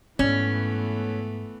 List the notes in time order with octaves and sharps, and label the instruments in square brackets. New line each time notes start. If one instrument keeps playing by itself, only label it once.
[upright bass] G#2 [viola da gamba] E3 A3 B3 [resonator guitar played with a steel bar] C#4